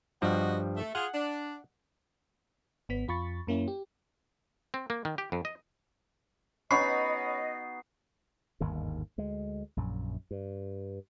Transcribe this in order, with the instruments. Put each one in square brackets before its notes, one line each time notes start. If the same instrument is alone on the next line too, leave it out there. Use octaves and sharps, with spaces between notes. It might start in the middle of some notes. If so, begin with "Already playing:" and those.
[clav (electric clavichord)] G2 F3 G3 [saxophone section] B3 F#4 D#5
[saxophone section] A3
[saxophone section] F4 G#4 [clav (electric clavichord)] F#5
[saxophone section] D4
[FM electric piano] G#1 B3 B6
F2 F4 B5 C#6 A6
F#2 A#3 C#4 E4
G4
[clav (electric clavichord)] C4
A#3
D#3
G4
F2
D#5
[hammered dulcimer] B3 D#4 F#4 [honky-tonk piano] C#4 B5 C#6 [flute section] D#5 [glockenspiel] C7
[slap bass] G1 D#2 G#2 D#3
D2 G#3
A#1 F#2
G2